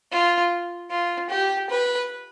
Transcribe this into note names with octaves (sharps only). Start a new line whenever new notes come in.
F4
F4
G4
B4